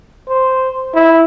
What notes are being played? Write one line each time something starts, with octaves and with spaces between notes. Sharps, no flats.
C5
E4